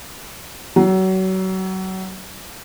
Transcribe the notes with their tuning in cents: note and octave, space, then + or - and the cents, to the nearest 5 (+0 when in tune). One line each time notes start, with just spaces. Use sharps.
F#3 +30